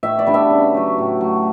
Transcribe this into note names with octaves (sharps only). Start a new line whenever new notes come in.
A2 E5
D5
G3 B3 D4
E5
C#3
F#3 A3
A2
F#3 A3